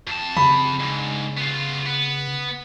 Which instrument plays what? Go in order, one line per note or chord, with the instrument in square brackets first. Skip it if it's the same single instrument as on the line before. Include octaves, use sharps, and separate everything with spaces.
[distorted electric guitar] F2 A5
[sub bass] C#3 [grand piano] B5
[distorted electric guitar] G#2 D3
B3 F4
B3